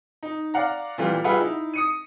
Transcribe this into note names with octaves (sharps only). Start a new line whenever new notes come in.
D#4
D5 F5 F#5 A#5
A#2 E3 G3 A3 F4
G3 F4 G#4 B4 E5 F#5
D#4 E4
D#6 C#7 D#7